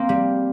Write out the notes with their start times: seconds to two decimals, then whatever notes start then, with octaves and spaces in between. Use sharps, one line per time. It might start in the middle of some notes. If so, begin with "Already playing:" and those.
Already playing: A#3 C4
0.09 G3